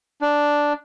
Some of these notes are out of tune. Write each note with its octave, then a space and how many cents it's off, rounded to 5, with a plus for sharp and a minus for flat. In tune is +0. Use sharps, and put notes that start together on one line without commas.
D4 +0